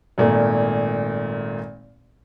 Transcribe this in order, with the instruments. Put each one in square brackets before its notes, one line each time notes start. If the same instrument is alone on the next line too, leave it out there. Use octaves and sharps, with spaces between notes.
[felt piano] G#1 A#2 A3